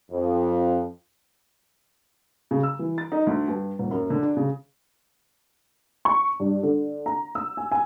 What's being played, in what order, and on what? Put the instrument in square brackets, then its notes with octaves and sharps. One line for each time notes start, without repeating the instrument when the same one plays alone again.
[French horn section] F2
[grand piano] C#3
E6
E3
A6
D#4
D2
G2
D#1
F#2
D3
D4
C#3
[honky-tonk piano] C#6
G2
D3
A#5
E6
G#5
G#5